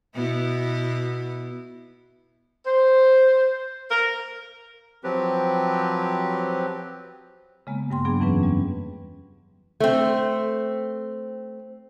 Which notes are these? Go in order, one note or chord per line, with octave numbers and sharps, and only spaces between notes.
B2 B3 E4
C5
A#4
F3 F#3 C4 G4 B4
C#3 G#3 A#3 B3
G2 G5 C6
F#3 B3 D4 G#4
F2 E3 C#4 B4
G3
A3 C4